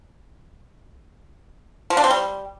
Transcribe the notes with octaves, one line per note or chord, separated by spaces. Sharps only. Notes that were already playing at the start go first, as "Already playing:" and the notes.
F3
D4
C4
G3